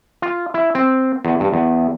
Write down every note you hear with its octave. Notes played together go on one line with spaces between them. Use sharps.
F4
E4
C4
E2
G2
E2